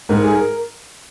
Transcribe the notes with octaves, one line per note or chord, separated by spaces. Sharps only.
G#2 A#4
G#4
A#4